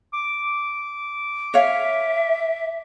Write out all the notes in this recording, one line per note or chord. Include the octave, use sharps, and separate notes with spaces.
D6
C#5 E5 F5